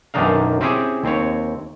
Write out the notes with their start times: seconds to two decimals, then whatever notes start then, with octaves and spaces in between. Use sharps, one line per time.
0.14 B1 F#2 D#3 D4 D#4 F5
0.61 C4 C#4 E4 G4 G#4
1.04 D#2 C4 C#5